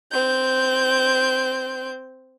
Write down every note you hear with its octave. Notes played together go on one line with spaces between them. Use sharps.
C4 G6